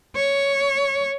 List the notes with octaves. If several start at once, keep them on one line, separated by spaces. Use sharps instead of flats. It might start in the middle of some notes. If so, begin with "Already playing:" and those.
C#5